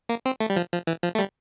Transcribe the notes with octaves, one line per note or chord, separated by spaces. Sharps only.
A#3
C4
A3
G3
F3
F3
E3
F3
A3
G3